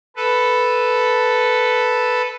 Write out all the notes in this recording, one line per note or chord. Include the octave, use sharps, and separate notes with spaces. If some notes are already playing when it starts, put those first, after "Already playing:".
A4 B4